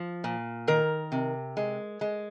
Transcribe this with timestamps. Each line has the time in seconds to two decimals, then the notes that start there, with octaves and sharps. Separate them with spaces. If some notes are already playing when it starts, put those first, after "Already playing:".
Already playing: F3
0.24 A#2
0.68 D#3 A#4
1.12 C3
1.57 G#3
2.01 G#3